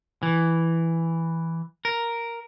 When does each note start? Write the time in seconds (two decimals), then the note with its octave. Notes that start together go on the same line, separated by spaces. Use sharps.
0.23 E3
1.85 A#4